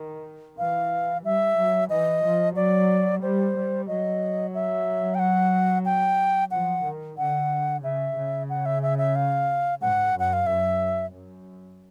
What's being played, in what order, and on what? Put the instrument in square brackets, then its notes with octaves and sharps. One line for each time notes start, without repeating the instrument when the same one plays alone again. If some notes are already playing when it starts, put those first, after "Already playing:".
Already playing: [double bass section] D#3
[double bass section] E3 [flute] F5
[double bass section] G3 [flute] E5
[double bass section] F#3
[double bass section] E3 [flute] D#5
[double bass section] F3
[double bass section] F#3 [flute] D5
[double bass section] G3 [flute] C5
[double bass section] G3
[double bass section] F#3 [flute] D#5
[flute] E5
G5
F#5
G5
[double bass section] F3 [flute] F#5
[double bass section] D#3
[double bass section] D3 [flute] F#5
[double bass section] C#3 [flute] E5
[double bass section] C#3
[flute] F#5
E5
E5
E5
F5
[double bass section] G#2 [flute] F#5
[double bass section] F#2
[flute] F#5
F5
[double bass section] F#2 [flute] E5
[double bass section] F#2